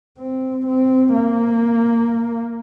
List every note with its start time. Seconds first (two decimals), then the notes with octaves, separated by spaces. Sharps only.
0.19 C4
0.67 C4
1.13 A#3